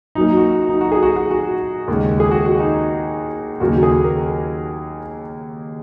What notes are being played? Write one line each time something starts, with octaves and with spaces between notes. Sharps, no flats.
F#2 F#3 A#3 D#4
F#4
F#4
D#4
F#4
G#4
F#4
F#4
F#4
D#2 C#3 G#3
G#4
F#4
F#4
D#4
D#2 C#3 F#3 A#3 F#4
G#4
A#4